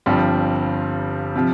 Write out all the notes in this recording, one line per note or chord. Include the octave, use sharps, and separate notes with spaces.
G1 G2 F3 G3 C4
C3 F3